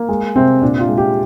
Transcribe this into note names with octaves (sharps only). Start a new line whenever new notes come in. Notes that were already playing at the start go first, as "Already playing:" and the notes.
Already playing: A#3
G#3
C3 C4
A#2 D4
F4
G#3
G4